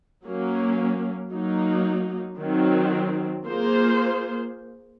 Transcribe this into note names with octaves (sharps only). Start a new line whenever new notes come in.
F#3 A#3 C#4
F#3 A#3 D#4
D#3 F#3 C4
A#3 F4 G#4 C5